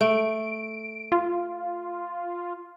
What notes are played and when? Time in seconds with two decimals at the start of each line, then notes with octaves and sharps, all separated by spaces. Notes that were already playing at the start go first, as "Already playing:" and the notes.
0.01 A3 D7
1.12 F4